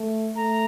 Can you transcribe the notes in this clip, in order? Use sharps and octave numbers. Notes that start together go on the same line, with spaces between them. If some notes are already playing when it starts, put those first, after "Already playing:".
Already playing: A3
A3 A#5